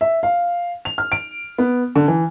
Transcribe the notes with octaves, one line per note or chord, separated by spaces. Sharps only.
E5
F5
F7
F6
D7
B3
D3
E3